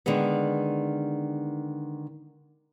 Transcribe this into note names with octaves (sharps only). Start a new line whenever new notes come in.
D3 D#3 G#3 B3